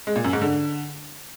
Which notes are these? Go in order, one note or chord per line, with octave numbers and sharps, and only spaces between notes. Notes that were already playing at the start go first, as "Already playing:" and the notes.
G#3
A#2
F#2
G#2
D3